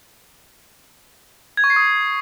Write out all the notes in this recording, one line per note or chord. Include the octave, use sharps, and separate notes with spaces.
G#6
C#6
C7
D#6